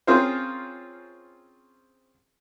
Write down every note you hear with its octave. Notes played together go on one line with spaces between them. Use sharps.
C4 C#4 F4 G#4 A#4 C5